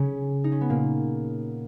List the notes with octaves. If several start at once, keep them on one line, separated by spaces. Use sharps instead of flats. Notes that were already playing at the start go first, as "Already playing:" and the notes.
Already playing: C#3 C#4
D#4
C#4
B3
A#2 A#3